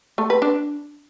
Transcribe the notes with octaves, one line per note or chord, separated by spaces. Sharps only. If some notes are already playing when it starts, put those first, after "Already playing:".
A3
B4
D4